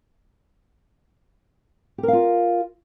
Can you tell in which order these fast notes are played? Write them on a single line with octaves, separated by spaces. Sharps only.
G4 A#4 F5 F4